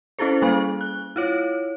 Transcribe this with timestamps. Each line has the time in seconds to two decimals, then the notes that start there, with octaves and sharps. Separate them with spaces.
0.19 C#4 E4 G#4 A4 C5
0.42 G3 A#3 F5 C#6
0.81 F#6
1.16 E4 F4 C#5